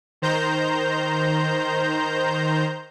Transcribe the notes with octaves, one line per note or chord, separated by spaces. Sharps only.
D#3 C5 A#5 G6